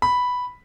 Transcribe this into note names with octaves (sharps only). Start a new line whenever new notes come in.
B5